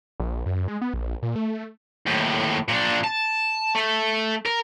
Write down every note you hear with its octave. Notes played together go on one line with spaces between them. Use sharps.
A#1
F#2
G#3
B3
A#1
A#2
A3
D#2 A2
A#2 D4
A5
A3
A#4